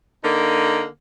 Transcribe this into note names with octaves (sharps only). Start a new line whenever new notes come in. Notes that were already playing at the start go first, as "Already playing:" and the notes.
D3 A#3 D#4